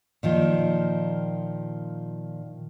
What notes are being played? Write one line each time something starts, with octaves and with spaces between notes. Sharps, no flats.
A#2 D#3 F3